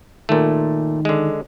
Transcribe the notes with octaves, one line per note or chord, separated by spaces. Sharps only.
A#2 D#3 A3
D3 G#3